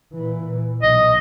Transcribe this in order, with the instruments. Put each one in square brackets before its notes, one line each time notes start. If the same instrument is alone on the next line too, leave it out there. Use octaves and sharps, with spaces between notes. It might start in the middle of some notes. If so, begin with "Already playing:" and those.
[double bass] A#2 E3
[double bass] B1 [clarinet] D#5